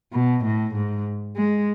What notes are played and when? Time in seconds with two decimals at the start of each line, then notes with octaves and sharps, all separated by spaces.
0.13 B2
0.44 A2
0.74 G#2
1.36 G#3